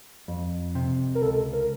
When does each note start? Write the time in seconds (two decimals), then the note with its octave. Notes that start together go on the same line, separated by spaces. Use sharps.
0.28 F2
0.75 C3
1.15 A#4
1.22 C#2 A4
1.53 A#4